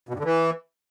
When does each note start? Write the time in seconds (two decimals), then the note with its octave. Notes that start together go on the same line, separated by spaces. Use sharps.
0.09 B2
0.14 G2
0.19 D3
0.24 E3